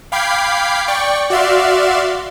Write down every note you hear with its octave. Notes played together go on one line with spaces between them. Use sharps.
F5 G5 B5 D6 G#6 C7
D5 G5 C#6
F#4 D5 E5 F5 C6